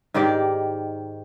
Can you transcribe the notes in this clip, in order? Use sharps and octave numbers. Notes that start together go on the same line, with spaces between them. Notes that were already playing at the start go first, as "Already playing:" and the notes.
G#2 D#3 G4 D5